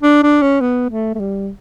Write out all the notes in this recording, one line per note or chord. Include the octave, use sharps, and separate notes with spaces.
D4
D4
C#4
B3
A3
A3
G3